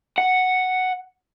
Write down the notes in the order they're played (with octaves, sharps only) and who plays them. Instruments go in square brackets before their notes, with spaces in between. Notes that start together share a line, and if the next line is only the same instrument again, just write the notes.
[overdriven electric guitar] F#5